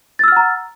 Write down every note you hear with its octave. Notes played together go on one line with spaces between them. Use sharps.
F#5 A#5 E6 F6 A6